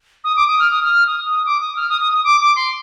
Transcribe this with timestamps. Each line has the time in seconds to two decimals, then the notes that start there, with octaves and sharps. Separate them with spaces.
0.24 D#6
0.36 D6
0.48 D#6
0.59 F6
0.71 D#6
0.83 F6
1.07 D#6
1.30 D#6
1.46 D6
1.61 D#6
1.77 F6
1.89 D#6
2.01 D#6
2.12 D#6
2.24 D6
2.41 D6
2.56 C6